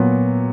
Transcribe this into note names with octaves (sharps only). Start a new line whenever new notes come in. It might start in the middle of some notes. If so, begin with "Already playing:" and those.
Already playing: A#2 F#3 B3